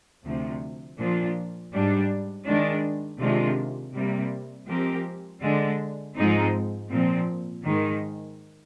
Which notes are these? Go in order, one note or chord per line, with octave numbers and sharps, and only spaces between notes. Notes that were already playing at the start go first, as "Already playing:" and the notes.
D2 C3 F3
A#2 F3 A#3 D4 F4
G#2 G3 D4
D#3 G#3 D4
C3 D#3 G#3 D4 F4
C3 G3 A#3
F3 G#3 C4 G4 A#4
D3 G#3 D4
G#2 F3 G#3 C4 D#4
A#2 F3 C4
G#2 D#3 G#3